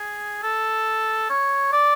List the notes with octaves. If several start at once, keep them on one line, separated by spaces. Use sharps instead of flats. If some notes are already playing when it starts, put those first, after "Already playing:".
Already playing: G#4
A4
C#5
D5